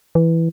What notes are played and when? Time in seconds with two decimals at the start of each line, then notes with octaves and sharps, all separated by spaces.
0.15 E3